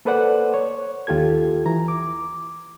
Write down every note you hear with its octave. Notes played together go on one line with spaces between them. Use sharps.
A#3 A4 B4 C5 D5 F#5
C#5
D#2 F4 G4 A4 G#6
E3 A#5
D6